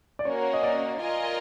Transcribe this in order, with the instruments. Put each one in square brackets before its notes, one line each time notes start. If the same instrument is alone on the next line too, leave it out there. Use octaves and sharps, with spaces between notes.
[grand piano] D5
[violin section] A#3 C#4 F#4 A#4 [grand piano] C#5
[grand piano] D#5
D5
[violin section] F4 A#4 D#5 G#5